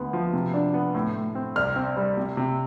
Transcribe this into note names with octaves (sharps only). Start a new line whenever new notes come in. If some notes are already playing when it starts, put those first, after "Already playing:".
Already playing: D2 B3
F3
C3
D4
B3
A2
A2
C4
C2 F6
C4
G3
C3
C3